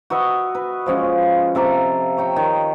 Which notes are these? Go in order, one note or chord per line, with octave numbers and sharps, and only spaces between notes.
F#4 B4 D#5 E5
B4
F3 G#3 C#4 F4
C3 A4 A#5 D6
C#5 G5 A#5
D#3